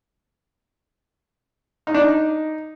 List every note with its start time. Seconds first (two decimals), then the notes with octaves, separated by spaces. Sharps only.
1.87 D#4
1.94 D4
2.02 D#4